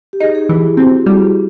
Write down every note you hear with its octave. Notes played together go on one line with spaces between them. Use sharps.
G4
D#4 G#4
G#4
E3 G#4
E4
C4 F#4
G3 G4